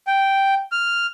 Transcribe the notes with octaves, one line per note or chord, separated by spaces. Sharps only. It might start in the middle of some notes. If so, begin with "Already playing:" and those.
G5
F6